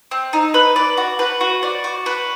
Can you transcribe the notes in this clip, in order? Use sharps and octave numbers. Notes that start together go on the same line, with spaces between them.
C4
D#4
B4
D5
F#4
B4
F#4
D5
F#4
B4